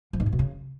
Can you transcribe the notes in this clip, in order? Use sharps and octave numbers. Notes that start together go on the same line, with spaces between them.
F3
G#2
A#2
B2
C#3